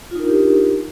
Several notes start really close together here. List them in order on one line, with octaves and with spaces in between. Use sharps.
F4 D#4 A#4 D4 G4